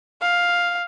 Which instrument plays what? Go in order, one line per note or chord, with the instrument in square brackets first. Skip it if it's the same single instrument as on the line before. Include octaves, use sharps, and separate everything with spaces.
[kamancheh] F5